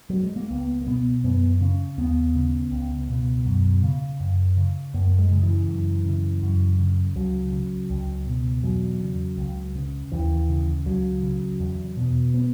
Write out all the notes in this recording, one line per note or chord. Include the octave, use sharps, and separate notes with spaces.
F#3
G#3
A#3
C#2 B3
A#3
B2 B3
F#2 B3
C#3 C#4
D#2 B3
C#3
C#2
B2
F#2
C#3
F#2
C#3
F#2 A#3
G#3
C#3
E3
F#2
C#3
F#2
C#3
C#2 F#3
C#3
C#2
B2
E2 F#3
C#3
C#2
C#3
D#2 E3
C#3
C#2 F#3
C#3
E2
B2
B3